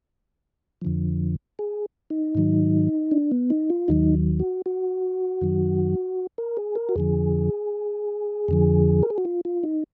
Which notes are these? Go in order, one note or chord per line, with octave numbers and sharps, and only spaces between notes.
F2 D3 F3
G#4
D#4
G#2 D#3 F#3
D4
B3
D#4
F4
D#2 D#3 F#3 D#4
F#4
F#4
F#2 D#3 F#3
A#4
G#4
A#4
F#4
F2 D3 F3 G#4
F2 D3 F3
A#4
G#4
F#4
F4
F4
D#4